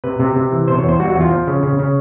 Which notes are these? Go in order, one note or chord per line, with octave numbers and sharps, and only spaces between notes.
C3 B4
C3
C3
E3
B2 C5
C#5
E2
C5
G3 F#4
F#4
E2
F4
F3
C#3
C#3
C#3